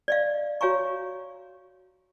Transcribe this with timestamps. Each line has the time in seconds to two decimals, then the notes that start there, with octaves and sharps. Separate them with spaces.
0.08 D5 D#5 F5
0.61 F#4 C#5 F5 G#5 A#5 C#6